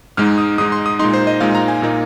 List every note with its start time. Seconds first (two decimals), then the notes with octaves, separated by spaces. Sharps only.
0.17 G#2 G#3 D#4 F6
0.38 D#6
0.58 G#2 G#3 D#4 D#6
0.72 C6
0.86 D#6
0.99 A#2 G#3 D#4 C6
1.14 C5
1.27 D#5
1.40 A#2 G#3 D#4 F5
1.55 A#5
1.68 G#5
1.82 A#2 A#3 D#4